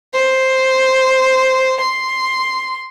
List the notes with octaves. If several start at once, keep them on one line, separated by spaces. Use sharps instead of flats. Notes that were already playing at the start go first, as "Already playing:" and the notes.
C5
C6